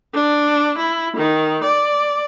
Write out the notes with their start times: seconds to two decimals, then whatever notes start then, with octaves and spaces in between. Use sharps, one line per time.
0.14 D4
0.78 E4
1.15 D#3
1.64 D5